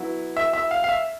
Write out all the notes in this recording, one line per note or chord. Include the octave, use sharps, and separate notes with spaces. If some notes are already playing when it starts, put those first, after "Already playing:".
Already playing: F#3 B3 E4
E5
E5
F5
F5
E5